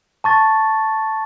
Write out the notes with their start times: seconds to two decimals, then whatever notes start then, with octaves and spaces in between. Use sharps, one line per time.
0.24 A5 C#6 A6